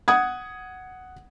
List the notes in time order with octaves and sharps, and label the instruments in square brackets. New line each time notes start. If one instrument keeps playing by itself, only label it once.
[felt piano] F#5 D#6 G#6